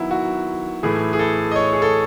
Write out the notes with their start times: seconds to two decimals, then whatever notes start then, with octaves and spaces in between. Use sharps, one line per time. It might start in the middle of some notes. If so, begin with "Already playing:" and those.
Already playing: D#3 F#3 B3 E4
0.11 F#4
0.83 A2 E3 A3 G#4
1.13 G#4
1.19 A4
1.51 D#5
1.56 C#5
1.73 G#4
1.82 A4